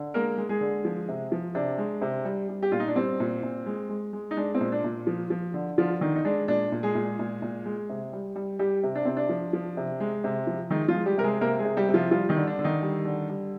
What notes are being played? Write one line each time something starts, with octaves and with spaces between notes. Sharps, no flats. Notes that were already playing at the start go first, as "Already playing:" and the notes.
Already playing: D3
G#3 A#3 A#4
G#3
G#3 G#4
D3
F3
C3
F3
C3 D4
G#3
C3
G3
G3
G4
A#2 F4
D#4
D4
G3 C4
A#2
A#2
G#3
G#3
G#3
D#4
G#3 D4
C4
A#2
D4
A#2
F3
F3
D3
D3 F3 F4
D3 D#3 D#4
D#4
G#3 D4
A#2 D4
A#2
G#3 G#4
A#2
A#2
A#2
G#3
C3
G3
G3
G3 G4
C3
D4
C3 C4
D4
F3
F3
C3
G#3
C3
F3
D#3 G#3 D#4
F3 F4
G#3
G3 G4
C3 A#4
G#3 G#4
C3 A#3 A#4
G#3 G#4
C3
G3 G4
C3
F3 F4
F3 G3 F4
D#3 D#4
D3
D4
D3
D#3 D#4
G3
D3
G3